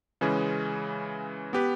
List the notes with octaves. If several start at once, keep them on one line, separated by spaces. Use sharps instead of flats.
C#3 E3 G#3 C#4 G#4
B3 G4 B4